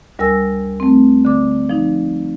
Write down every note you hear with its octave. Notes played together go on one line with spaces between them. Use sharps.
D2 G3 A#4 G#5 E6 A#6
A3 C4
D3 D6
F3 D#4